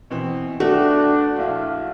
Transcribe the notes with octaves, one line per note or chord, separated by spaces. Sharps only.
B2 E3 C4
A3 B3 D4 F#4 G5
A#1 E4 F5